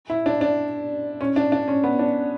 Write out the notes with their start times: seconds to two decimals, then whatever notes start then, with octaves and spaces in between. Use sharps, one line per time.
0.10 E4
0.26 D4
0.41 D4
1.21 C#4
1.36 D4
1.52 D4
1.68 C#4
1.84 B3
1.99 D4